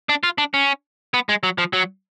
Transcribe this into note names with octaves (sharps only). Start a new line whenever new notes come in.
D4
F4
D4
C#4
B3
G#3
F#3
F3
F#3